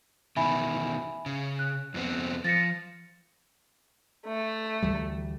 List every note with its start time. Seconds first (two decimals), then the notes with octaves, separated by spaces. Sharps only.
0.36 B2 D#3 E3 E5 G#5 B5
1.26 C#3
1.59 F#6
1.94 F2 B3 C4
2.44 F3 A6 A#6 C#7
4.26 A3
4.82 D2 E3 G3